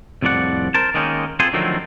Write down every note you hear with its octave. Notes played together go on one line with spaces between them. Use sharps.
C2 F2 A2 F3 D5 F#5
A#4 C5 A5
D#3 G#3 A#3 C#4 D#4
C4 F4 G#4 A4 C5
D3 D#3 F3 F#3 A3 C4